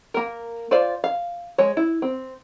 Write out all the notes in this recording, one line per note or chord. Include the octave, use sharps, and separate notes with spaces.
A#3 A#4
F4 C5 D5 F5
F5
G#3 C#5
E4
C4